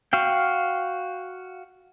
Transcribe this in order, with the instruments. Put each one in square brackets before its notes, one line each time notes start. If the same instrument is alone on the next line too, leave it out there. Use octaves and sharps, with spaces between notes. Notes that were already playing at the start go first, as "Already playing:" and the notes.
[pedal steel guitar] F#4 F5 G5